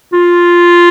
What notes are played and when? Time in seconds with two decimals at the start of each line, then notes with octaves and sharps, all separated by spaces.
0.13 F4